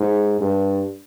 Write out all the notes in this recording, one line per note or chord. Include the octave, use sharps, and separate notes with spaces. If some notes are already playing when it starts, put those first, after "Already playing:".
Already playing: G#2
G2